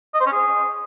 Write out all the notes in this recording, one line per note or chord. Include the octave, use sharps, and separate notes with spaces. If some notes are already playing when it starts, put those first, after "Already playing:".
D#5
C5
C#4
G#4